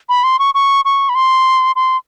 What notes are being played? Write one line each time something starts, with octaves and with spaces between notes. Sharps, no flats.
B5
C6
C#6
C#6
C#6
B5
C6
C6